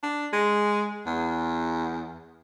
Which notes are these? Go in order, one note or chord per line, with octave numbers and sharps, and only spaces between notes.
D4
G#3
E2